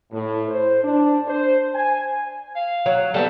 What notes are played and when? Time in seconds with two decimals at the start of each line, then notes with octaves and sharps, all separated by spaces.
0.12 A2
0.49 C5
0.84 D4
1.28 C5
1.74 G#5
2.55 F5
2.86 F#3
3.14 G3 A3 B3 A4